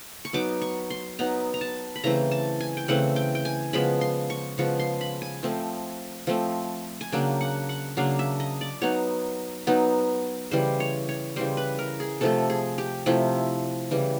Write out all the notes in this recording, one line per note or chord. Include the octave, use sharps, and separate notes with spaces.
C#6
F#3 B3 D#4 D6
C#6
C6
F#3 B3 D#4 A#5
A#5
A5
B5
C#3 E3 A3 C4 A#5
A5
G#5
G5
C#3 E3 A3 C4 F#5
G5
G5
G#5
C#3 F3 G#3 B3 B5
C6
C#6
C#3 F3 G#3 B3 C#6
C6
B5
G#5
F3 A3 C4
F3 A3 C4
G#5
C#3 F#3 A#3 D4 G5
F#5
F#5
C#3 F#3 A#3 D4 F5
E5
D#5
D5
F#3 B3 D#4 C#5
F#3 B3 D#4
C#3 E3 G3 C5
C#5
C#5
C#3 E3 G3 C5
B4
A#4
G#4
C3 F3 A3 A4
G#4
G4
C3 F3 A3 E4
C#3 E3 G3